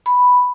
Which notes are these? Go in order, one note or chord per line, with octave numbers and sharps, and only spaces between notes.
B5